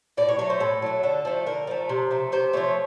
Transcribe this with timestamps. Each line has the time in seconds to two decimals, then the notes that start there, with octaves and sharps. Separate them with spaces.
0.17 A2 D5
0.29 C#5
0.39 F#3 A3 C#5
0.50 C5
0.60 A2 A4
0.82 F#3 A3
1.03 D3 A4
1.25 F3 A3
1.46 D3 A#4
1.67 F3 A3
1.89 C3
2.11 F3 A3
2.32 C3 C5
2.53 F3 A3 C#5